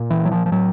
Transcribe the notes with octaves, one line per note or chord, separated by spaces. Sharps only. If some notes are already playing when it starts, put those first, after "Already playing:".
Already playing: A#2
E3
F#3
F3
F3
A2 F#3